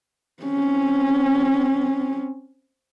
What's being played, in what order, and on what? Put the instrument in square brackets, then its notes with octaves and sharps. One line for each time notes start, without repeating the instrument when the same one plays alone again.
[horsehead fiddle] C4 C#4